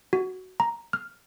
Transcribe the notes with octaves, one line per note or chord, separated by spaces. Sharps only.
F#4
A#5
F6